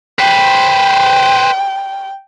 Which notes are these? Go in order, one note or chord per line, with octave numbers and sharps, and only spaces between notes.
B4 C5 G5